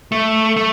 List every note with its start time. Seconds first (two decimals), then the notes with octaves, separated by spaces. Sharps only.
0.12 A3
0.56 A3